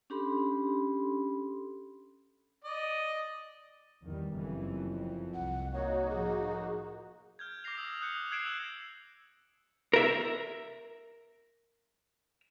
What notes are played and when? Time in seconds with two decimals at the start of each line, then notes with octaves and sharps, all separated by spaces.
0.10 C#4 D4 G4 A4 B5 C6
2.64 D5 D#5
4.04 E2 D#3 G3
4.35 F#1 F2 E3
5.34 C2 F#5
5.74 A#3 D#4 F#4 C#5
6.10 A2 F3 G#4
7.39 F6 G6 G#6
7.64 D6 F6 G6 A#6 C7 F7
7.78 D#6 E6
8.01 D#6 F#6 G6 C#7
8.31 E6 F#6 G#6 C7 D7 E7
8.43 E6 F#7
9.93 A#4 E5